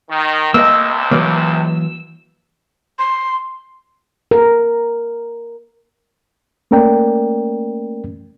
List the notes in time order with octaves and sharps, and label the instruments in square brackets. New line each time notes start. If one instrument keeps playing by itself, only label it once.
[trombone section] D#3
[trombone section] C#2 C3 [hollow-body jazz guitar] A#3 D#5 [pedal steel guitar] E6
[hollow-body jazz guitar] E3 F#3 A#3
[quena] C6
[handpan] A#4
[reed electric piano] A3 A#3 C#4 A#4 D5 G5